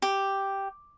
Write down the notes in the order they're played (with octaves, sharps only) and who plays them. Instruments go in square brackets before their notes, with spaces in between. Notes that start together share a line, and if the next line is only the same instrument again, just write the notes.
[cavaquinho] G4